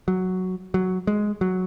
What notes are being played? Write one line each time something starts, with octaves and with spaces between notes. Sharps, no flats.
F#3
F#3
G#3
F#3